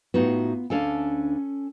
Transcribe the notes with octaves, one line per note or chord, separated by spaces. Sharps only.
A2 B3 D#4 F4 F#4
D2 C#4 D4 A4 F5 G#5